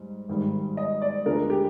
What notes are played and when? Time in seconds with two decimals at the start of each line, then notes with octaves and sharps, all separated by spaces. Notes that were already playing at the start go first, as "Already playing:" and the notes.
Already playing: G#2 G3
0.29 G#1 G#2 D#3 G3
0.77 D#5
1.02 D5
1.26 D2 D3 G#3 D4 F4 A#4
1.50 G4